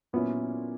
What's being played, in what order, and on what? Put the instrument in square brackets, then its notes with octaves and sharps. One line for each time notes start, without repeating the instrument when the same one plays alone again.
[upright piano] A#2 F#3 C#4 E4 [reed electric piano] B3